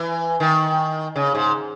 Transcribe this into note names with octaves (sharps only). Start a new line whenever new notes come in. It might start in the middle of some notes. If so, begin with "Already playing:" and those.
Already playing: E3
D#3
C#3
G#2